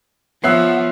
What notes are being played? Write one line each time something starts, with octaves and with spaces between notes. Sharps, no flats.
F3 B3 C#5 E5 F#5 E6 F#6 C7